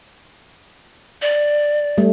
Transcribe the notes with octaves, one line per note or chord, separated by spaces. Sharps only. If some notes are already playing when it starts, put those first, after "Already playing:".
D5
G3 A3